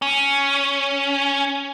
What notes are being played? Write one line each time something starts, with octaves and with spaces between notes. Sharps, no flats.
C#4